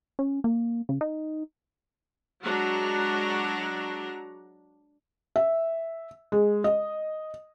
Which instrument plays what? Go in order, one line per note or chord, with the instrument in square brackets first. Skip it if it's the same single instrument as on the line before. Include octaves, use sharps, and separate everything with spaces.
[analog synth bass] C#4
A#3
C#3
D#4
[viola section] F#3 G#3 D4 F#4 F#5 A#5
[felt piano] E5
G#3
D#5